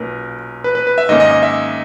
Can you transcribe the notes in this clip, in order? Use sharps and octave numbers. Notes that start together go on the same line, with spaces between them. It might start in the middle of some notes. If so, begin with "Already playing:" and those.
Already playing: B1 A#2 A#3 C#4 A#4 B4
B4
B4
B4
E5
G#2 D#3 A#3 C#4 D#5
D#5
D#5
E5